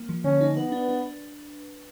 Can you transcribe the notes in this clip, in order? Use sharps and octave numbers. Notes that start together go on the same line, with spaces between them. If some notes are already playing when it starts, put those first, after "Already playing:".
Already playing: A#3
F3
D3 C#4
D#4
B3 B4
D4
D4